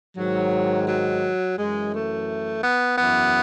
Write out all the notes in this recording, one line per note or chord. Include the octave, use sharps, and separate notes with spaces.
G#2 D#3 F#3
F#3
F#2 E3 G#3
A3
B3
F#2 E3 B3